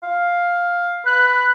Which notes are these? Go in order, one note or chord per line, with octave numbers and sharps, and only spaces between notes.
F5
B4 F#6